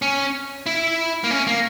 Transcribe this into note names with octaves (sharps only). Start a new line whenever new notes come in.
C#4
E4
A#3
C#4
A#3